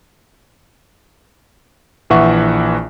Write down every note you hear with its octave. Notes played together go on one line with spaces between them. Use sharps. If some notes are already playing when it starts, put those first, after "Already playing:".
A#1 E3 E5 F#5 C#6